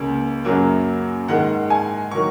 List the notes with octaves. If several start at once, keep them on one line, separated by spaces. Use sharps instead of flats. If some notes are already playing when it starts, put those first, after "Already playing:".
Already playing: C#2 C#3 A#3
F#2 C#3 F#3 A#3
G#2 D#3 G#3 F#5
G#5
D#3 F#3 A#3 C#6